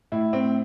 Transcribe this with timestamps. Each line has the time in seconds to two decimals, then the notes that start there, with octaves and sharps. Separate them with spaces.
0.12 A2 E4
0.33 A2 C4